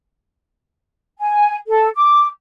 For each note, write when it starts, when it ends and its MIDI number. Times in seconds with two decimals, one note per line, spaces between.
1.20 1.55 80
1.68 1.88 69
1.95 2.25 86